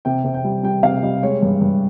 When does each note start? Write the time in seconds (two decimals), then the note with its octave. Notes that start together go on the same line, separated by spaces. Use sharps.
0.05 C3 G5
0.24 C3
0.34 G5
0.44 G3
0.63 G3 G5
0.83 C3 F5
1.03 G3 D#5
1.23 G#3 C#5
1.42 G2
1.61 G2